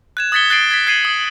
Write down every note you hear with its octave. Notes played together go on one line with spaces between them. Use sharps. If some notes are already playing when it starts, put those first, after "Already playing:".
F#6 G#6 E7
D#6 G#6 A6 B6 C#7 G7
F#6 A6 C7 D7
G#6 A6 B6
F#6 G#6 C7 D#7 F#7
D#6